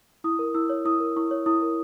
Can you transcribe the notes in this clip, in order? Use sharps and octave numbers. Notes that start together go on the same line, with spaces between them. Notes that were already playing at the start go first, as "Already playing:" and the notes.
E4 D#6
A#4
E4 E6
C#5
E4 D#6
A#4
E4 C#6
C#5
E4 D#6
A#4